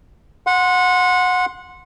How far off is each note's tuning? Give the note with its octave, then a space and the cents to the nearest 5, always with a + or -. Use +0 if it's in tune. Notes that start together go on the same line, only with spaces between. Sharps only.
F#5 -20 C6 +0